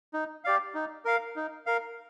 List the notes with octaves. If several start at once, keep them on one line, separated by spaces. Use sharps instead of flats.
D#4
G4 D5 F5
D#4
A#4 F5
D#4
A#4 F5